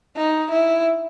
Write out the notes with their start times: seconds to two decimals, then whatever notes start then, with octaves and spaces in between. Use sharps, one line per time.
0.16 D#4
0.52 E4